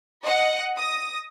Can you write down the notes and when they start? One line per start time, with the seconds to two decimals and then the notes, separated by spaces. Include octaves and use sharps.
0.23 D#5 F#5
0.76 D#6 A#6